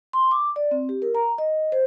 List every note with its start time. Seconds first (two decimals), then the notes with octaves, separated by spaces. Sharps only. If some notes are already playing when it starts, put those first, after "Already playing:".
0.13 C6
0.31 D6
0.56 D5
0.71 C4
0.89 G4
1.02 A#4
1.15 A#5
1.38 D#5
1.72 C5